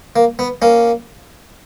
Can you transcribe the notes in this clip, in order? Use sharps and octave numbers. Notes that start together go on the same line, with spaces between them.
A#3
B3
A#3 C#4